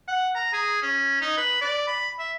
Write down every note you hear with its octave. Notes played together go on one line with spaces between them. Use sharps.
F#5
A#5
G#4
C#4
D#4
B4
D5
B5
E5